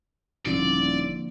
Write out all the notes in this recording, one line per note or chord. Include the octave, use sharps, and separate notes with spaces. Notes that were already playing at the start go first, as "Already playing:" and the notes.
D#1 D3 F3 A#3 C4 D4 E4 D5